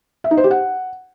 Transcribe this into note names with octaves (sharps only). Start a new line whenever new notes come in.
E5
D#4
C5
G4
F#5